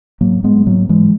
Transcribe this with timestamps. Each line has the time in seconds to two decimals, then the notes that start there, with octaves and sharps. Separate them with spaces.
0.21 G#2 F#3 A#3
0.44 G#2 G#3 B3
0.67 G#2 F#3 A#3
0.89 G#2 E3 G#3